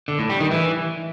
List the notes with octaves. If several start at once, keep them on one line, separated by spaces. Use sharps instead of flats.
D3
A2
G3
D#3
E3